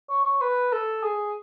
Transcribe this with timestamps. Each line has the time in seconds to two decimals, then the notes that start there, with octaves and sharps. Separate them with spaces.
0.10 C#5
0.25 C#5
0.41 B4
0.72 A4
1.03 G#4